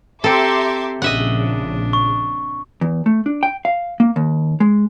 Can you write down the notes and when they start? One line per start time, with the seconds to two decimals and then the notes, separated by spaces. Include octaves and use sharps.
0.24 C4 G4 A4 E5 A#5 C6 D6
1.02 A#1 C#3 D4 D#5 E5 F#5
1.93 C#6
2.81 E2
3.06 A3
3.26 D4
3.43 G5
3.65 F5
4.00 A#3
4.16 D#2
4.60 G#3